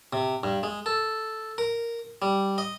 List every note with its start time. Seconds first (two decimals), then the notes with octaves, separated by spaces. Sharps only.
0.13 C3
0.43 G2
0.63 G#3
0.86 A4
1.58 A#4
2.22 G3
2.58 D#5